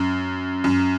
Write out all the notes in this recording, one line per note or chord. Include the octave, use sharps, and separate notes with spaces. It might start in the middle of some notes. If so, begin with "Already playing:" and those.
Already playing: F#2
F#2